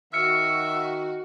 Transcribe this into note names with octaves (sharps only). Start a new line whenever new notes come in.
D#3 F#4 E5 F6 C#7